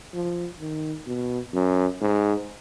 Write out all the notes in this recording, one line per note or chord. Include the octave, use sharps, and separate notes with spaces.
F3
D#3
B2
F#2
G#2